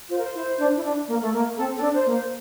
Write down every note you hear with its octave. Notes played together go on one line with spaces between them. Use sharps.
F4 C5
A#4
C5
E4
D4
E4
D4
A#3
A3
A#3
C4 A4
C4 A4
D4
C5
A#3
C5